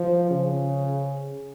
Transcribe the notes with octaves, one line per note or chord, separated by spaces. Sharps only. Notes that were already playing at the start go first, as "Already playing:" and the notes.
Already playing: F3
C#3